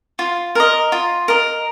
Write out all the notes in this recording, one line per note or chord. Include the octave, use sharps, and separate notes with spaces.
F4
A#4 D#5
F4
A#4 D#5